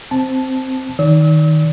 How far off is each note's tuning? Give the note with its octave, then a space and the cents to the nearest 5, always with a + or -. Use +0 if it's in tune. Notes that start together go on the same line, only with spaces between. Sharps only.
C4 +0 A5 -10
D#3 +5 D5 -35 E6 -40